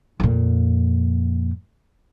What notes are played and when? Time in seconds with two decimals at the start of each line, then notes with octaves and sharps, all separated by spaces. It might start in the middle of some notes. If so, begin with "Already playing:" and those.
0.20 F2 A#2